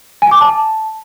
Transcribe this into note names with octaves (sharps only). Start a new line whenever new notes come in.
G#5
D6
A5